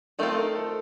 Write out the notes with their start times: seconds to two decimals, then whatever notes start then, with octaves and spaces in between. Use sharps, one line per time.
0.19 D#3 A3 C4 F4 A4
0.38 A#4
0.55 A4